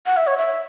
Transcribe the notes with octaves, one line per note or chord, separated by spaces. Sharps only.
F#5
E5
C#5
E5